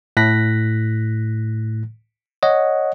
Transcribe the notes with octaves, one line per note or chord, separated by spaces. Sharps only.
A2 F#6 A#6 B6
C#5 D#5 F#5